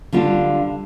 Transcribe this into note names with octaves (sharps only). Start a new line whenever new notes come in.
D3 G3 D4 F4